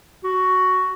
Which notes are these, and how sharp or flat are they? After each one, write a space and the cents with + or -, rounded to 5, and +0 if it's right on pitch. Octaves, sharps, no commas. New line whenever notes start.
F#4 +10